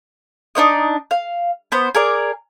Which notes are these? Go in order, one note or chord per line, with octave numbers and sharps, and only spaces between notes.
D4 D#4 C5 D#5
F5
B3 C5
G#4 A#4 D5